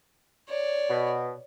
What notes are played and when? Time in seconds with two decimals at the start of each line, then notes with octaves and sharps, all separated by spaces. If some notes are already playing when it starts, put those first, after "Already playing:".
0.49 C#5 D5
0.90 B2